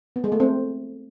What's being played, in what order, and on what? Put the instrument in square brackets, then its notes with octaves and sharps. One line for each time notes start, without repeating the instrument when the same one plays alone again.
[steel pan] B3
G#3
A3
C4